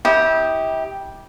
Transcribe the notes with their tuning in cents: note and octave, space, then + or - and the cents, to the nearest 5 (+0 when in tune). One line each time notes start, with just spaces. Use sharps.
E4 -35 G4 +0 D#6 +0